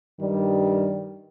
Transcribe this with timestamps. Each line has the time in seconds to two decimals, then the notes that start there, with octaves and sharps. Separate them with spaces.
0.19 G2 D#3 G3